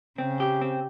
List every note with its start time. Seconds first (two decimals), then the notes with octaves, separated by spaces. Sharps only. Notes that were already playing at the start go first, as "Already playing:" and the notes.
0.18 C#3 C4
0.40 G4
0.61 C4